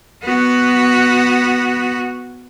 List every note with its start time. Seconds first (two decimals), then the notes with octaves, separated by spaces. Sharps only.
0.23 B3 F#4